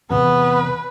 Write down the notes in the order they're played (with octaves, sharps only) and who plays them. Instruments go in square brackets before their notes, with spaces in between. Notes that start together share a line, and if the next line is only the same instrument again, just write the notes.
[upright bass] E2 C3 [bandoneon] B3 [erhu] B4